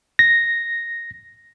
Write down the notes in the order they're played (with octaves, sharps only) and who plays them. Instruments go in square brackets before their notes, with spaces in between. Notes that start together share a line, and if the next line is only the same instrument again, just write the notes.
[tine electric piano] A#6